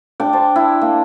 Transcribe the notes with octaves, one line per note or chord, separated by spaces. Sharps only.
D4 G5 D6
C5 A5
E4
A#3